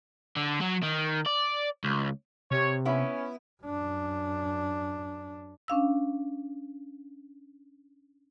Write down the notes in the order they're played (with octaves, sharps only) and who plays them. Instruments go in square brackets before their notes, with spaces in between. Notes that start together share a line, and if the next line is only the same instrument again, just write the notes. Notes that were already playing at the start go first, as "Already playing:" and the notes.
[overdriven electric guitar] D3
F#3
D#3
D5
C#2
[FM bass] C3 [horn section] C#5
[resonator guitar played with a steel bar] B3 E4 [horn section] C#4
[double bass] F#2 D4
[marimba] C#4 D4 F5 E6